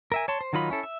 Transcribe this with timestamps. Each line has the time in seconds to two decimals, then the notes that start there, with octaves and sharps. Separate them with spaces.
0.12 A#4 E5 G#5
0.28 C#5 A5 C6
0.41 C5
0.53 D#3 F#3 D#4 F4 B5
0.70 C#4 E4 A4
0.83 E5